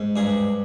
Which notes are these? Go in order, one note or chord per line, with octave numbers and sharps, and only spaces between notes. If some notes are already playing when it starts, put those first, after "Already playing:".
Already playing: G#2
G2 G#4